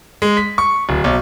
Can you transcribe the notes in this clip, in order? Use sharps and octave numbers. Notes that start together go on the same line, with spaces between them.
G#3
B6
C#6
D1
B1